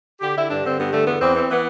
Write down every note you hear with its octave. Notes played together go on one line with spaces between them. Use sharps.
D3 G4
D3 E4
G2 D4
D3 C4
G2 B3
D3 A3
E2 B3
E2 C4
E3 C4
E3 B3